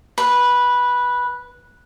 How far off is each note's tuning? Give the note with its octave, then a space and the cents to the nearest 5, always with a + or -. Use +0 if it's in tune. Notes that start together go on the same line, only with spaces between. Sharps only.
B4 -10